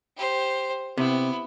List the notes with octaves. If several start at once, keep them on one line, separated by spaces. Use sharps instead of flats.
G4 C5
C3 B3 E4